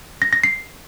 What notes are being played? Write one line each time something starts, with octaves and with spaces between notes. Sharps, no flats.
A#6
A#6
C7